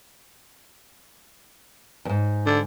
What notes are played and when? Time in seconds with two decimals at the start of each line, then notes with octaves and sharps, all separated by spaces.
2.05 E2 G#2
2.46 D3